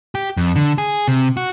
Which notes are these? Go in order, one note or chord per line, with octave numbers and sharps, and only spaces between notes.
G4
F2
D3
G#4
C3
F#4